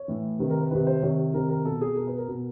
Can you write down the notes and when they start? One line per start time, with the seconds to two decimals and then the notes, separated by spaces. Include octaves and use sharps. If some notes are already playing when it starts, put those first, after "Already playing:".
Already playing: C#5
0.08 A2 E3
0.39 C3 D#3 B4
0.50 A#4
0.60 B4
0.71 C3 D#3 B4
0.87 C5
1.02 C3 D#3 C#5
1.34 C3 D#3 A#4
1.50 A#4
1.65 B2 A4
1.81 G#4
1.97 B2 A#4
2.07 B4
2.18 A#4
2.28 B2